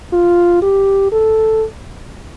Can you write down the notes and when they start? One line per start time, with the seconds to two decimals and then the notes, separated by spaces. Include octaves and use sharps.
0.13 F4
0.62 G4
1.12 A4